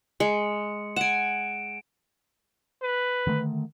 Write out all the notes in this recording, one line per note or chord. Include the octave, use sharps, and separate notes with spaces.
G#3 C#7
F#5 G#5 D7 E7
B4
D3 D#3 A3